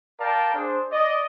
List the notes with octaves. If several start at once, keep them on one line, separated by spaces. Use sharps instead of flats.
A#4 D5 F5 G5 A5
D4 G#4 C5
D5 D#5